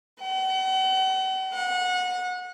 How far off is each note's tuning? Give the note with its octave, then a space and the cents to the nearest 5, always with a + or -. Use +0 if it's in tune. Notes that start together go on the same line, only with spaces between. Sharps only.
F#5 +45
F#5 -25